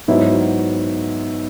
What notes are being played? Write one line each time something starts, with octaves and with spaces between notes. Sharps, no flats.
G#2 F#3 B3 E4 C#5